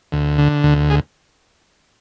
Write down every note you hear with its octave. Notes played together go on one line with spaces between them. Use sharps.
D2
D3
D2
G#4